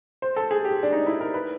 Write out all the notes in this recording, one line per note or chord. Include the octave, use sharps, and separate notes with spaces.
C5
A4
G#4
G4
D4
D#4
E4
A#4
B4